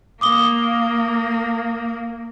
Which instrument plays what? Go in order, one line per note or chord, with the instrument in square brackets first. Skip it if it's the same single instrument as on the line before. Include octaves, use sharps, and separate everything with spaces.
[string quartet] A#3 [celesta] D6 D#6 G7